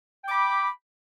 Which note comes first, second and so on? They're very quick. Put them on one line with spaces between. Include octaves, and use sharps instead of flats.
G5 D6 B5